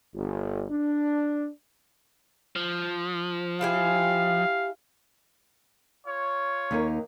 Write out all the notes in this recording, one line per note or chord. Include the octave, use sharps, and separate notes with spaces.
G1
D4
F3
E4 G4 F5 G#5
F4 C#5
D#2 D#4 A#4